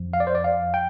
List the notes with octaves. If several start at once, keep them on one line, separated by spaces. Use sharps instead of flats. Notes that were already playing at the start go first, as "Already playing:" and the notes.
Already playing: F2 F3
F5
D5
C5
D5
F5
G5